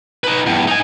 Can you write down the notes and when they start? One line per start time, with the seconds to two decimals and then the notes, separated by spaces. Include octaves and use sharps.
0.24 D#4 B4
0.46 E2 G2
0.68 D#4 G#5